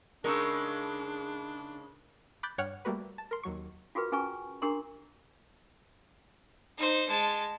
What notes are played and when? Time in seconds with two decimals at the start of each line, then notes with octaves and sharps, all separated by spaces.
0.24 C#3 G#3 D4 D#4 A#4 C#6 E6
2.43 B5 D6 F#6 G6 A6
2.58 G2 C#5 F#5 G5 F6
2.85 G3 A3 A#3 F#4 B4
3.18 A5
3.31 A#4 C6
3.43 D#2 F#3 C#6
3.95 F4 F#4 G#4 A#4 B4
4.12 C#4 G#4 B4 G#5 A#5 C#6
4.62 D4 G4 G#4 A#4 A#5 C6
6.78 D#4 C5
7.09 G#3 A5